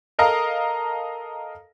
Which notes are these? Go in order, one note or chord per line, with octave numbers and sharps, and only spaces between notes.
A4 A#4 D#5 F5 A#5